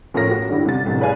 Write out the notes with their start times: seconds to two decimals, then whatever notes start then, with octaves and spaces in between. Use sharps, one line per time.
0.14 A2 F3 A#4 C#5 A#6
0.31 F#4
0.49 G2 D3 G3 E4
0.65 C2 A6
0.85 F1 C2 A2
1.00 G#4 B4 D5 F5 G#5